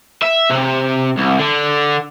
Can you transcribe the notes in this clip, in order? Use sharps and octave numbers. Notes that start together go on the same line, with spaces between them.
E5
C3
C2
D3